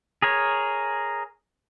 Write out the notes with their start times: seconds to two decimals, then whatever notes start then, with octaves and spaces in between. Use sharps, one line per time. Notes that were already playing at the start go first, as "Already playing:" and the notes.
0.22 G#4 A#4 C#5